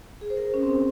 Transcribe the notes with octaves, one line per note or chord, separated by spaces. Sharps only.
G#4
C5
A#4
C#4
C4